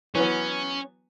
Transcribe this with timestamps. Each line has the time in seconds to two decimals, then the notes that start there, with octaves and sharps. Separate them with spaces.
0.15 E3 F#3 B3 C#4